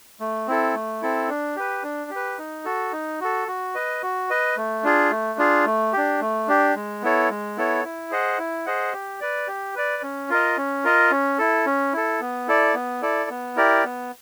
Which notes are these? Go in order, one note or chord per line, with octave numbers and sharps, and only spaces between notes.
A3
C4 E4 A4
A3
C4 E4 A4
D4
G4 B4
D4
G4
B4
D#4
F#4 A4
D#4
F#4 A4
F#4
B4 D#5
F#4
B4 D#5
A3
D4 F4 G#4
A3
D4 F4 G#4
A3
D4 G4
A3
D4 G4
G#3
B3 E4 A4 C#5
G#3
B3 E4 A4 C#5
E4
G#4 C5 D#5 F#5
E4
G#4 C5 D#5 F#5
G4
B4 D5
G4
B4 D5
C#4
F4 A#4 D#5
C#4
F4 A#4 D#5
C#4
E4 A4
C#4
E4 A4
B3
E4 A4 D5
B3
E4 A4 D5
B3
E4 G4 A#4 D5
B3